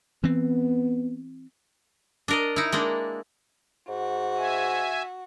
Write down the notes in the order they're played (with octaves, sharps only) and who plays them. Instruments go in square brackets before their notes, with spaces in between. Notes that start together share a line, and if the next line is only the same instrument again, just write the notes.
[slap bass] E3 C4 [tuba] B3
[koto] D4 A#4 D#5
D#4 E4
G#3 A#3 D4
[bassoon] G#2 [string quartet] F#4
[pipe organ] E5 G#5